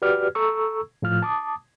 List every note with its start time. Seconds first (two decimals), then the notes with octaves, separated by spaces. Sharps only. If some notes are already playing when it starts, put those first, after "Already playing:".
0.02 F#4 G4 B4 D5 F6
0.35 A4 A#5 C#6 E6
1.02 A2 F3 F4 F6
1.22 A5 D6 D#6